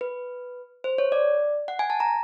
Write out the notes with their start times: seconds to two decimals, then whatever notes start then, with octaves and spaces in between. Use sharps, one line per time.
0.01 B4
0.84 C5
0.98 C#5
1.12 D5
1.68 F#5
1.79 G#5
1.90 A5
2.00 A#5